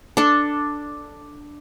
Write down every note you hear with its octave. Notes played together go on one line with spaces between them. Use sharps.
D4 A4